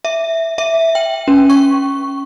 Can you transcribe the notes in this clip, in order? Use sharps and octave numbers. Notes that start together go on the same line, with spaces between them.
E5
E5
G5
C#4
C#6